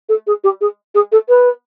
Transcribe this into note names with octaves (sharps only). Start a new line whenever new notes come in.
A4
G#4
G4
G#4
G#4
A4
B4